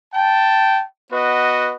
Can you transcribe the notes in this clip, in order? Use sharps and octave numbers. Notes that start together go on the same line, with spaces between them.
G5 A5
B3 F#4 B4 D#5